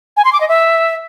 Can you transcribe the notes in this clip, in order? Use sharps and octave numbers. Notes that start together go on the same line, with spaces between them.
G#5
C6
D6
D#5
E5